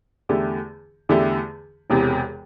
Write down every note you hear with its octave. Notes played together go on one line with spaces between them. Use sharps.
E2 D3 A3 E4 G4
E2 D3 A3 E4 G4
E1 E2 C3